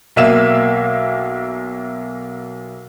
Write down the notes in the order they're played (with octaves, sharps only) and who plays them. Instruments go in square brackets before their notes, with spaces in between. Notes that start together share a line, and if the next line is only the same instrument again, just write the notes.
[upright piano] B1 A#3 E5 F5 E7